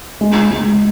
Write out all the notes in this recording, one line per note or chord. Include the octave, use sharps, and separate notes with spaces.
G#3
G#3